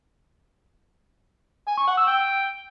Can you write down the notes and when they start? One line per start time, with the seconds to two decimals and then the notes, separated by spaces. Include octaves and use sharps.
1.68 G#5
1.77 C#6
1.87 F#5
1.97 E6
2.07 G5